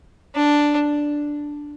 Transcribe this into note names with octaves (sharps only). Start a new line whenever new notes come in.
D4